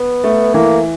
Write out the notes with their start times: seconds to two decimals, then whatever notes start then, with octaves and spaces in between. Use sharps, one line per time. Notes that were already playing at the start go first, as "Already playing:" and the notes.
Already playing: B3
0.24 A3
0.54 E3 A#3